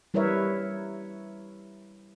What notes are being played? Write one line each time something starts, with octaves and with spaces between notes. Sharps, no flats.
G3 E4 A#4 B4 C#5 E5